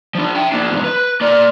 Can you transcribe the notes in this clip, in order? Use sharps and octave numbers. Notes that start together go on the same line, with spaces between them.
F3 D4
E5 G5
A#3 D4
E2 G#2
B4
A#3 D5